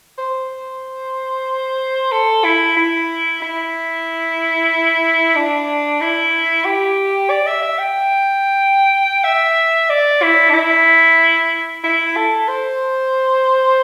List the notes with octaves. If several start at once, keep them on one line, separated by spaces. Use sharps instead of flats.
C5
A4
E4
E4
E4
D4
E4
G4
D5
E5
E5
G5
E5
D5
E4
D4
E4
E4
A4
C5